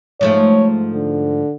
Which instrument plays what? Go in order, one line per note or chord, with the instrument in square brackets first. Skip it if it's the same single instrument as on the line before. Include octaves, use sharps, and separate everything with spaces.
[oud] G#2 F3 A3 [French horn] C#5
[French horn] D3